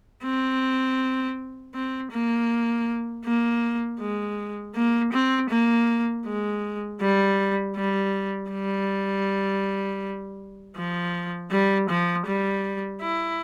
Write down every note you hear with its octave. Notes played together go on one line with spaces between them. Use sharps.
C4
C4
A#3
A#3
G#3
A#3
C4
A#3
G#3
G3
G3
G3
F3
G3
F3
G3
E4